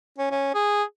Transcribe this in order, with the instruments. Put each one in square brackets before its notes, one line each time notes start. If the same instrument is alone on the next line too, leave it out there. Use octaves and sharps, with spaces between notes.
[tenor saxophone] C#4
C#4
G#4